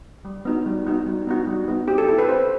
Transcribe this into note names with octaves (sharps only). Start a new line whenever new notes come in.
G3
B3 D#4 F#4
G3
B3 D#4 F#4
G3
B3 D#4 F#4
G3
B3 D#4 F#4
C4 G4
A4
E4 G4 A4
B4
C4 C5